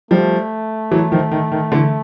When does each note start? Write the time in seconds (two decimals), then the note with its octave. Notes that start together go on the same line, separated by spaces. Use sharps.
0.11 F3 G3 A3
0.91 E3 F#3
1.12 D#3 F3
1.31 D#3
1.52 D#3
1.72 D3 E3